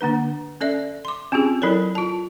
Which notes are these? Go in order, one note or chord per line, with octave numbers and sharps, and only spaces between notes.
D3 A#3 D4 B4
C#4 A4 D5 E5
C6 D6
C4 C#4 F4 G4 G#4
F#3 E4 A4 A#4 C#5
F4 A5